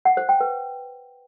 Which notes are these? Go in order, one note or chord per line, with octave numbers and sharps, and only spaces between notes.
F#5
C5
G5
B4